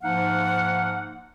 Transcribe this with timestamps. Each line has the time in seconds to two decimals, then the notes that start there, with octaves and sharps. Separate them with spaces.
0.02 G#2 F3 A#3 D#4 F5 F#5